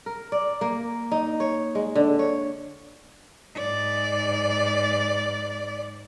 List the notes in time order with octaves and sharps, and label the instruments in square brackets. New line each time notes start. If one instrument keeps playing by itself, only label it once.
[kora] A#4
D5
A#3
D#4
C#5
G#3
D3
C#5
[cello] G#2 D5